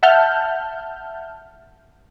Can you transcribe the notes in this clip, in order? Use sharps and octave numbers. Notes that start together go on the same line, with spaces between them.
E5 F#5 A5 F6 G6